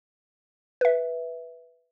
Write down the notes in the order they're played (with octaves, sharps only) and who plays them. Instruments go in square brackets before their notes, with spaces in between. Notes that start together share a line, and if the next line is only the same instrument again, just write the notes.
[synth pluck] B4 E5